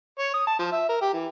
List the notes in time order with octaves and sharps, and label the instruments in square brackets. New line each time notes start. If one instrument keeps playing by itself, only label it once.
[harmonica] C#5
D#6
A5
F3
E5
A#4
G4
E3